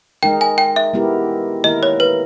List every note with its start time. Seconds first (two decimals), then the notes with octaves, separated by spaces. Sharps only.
0.23 G#3 D#4 A#4 G5
0.41 G#5
0.58 G5
0.76 E5
0.94 G#3 B3 E4 G4 A#4
1.64 D#3 A#3 E4 A#4 D#5
1.83 C#5
2.00 B4